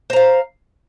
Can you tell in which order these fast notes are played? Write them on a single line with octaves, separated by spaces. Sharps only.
C5 A#5 F5